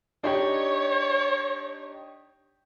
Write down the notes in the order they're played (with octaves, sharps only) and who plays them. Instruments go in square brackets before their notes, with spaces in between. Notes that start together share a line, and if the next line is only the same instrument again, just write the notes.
[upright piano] D4 D#4 G4 [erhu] C#5